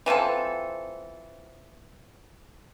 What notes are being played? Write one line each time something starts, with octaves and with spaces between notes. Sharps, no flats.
E3 F3 C4 A4